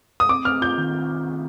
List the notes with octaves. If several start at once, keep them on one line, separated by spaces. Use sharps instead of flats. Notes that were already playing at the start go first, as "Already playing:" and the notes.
D#6
C4 D6
C4 F6
F4 G6
D#3
C4